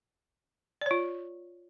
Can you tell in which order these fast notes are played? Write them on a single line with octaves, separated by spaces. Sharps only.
D5 C#5 F4